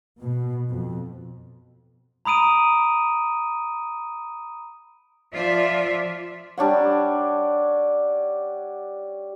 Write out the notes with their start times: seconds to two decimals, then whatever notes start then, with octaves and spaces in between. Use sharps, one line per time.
0.18 B2
0.70 F2
2.25 A#5 B5 D#6 D7 D#7
5.34 F3 F4 D5 E5
6.57 G3 D4 C#5 F#5